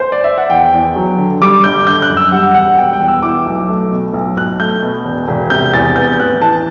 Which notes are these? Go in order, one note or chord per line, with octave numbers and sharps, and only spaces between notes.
C5
D5
E5
F#5
E2 G5
E2
F#3
D3
G3 D6
G1 G6
D3 G6
F#6
F#2
E6
G3 F#5
E1 F#5
B2 G5
G5
E2
E6
E4 D6
B1
A3
B2
B1
B1 F#6
A3 G6
B2
E1
E1
C3 G6
E2 A6
B3 G6
A1 F#6
E3 A5